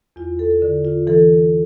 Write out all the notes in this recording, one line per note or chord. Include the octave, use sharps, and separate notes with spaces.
E2 F4
A4
D3
F4
E3 A4